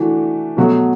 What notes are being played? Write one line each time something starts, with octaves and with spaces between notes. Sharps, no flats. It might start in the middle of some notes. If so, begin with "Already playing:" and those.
Already playing: E3 A3 D4 F#4
B2 F#3 A3 F#4